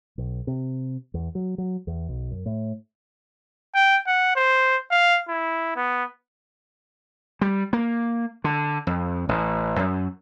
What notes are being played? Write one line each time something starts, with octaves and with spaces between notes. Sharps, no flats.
B1
C3
E2
F#3
F#3
E2
B1
F#2
A2
G5
F#5
C5
F5
E4
B3
G3
A#3
D3
F2
A1
F#2